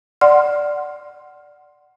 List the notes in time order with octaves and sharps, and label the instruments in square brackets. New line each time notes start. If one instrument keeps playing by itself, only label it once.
[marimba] D5 F#5 C6 F6